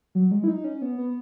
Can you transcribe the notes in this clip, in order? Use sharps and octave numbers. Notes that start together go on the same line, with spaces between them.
F#3
G#3
E4
D#4
C#4
B3
B3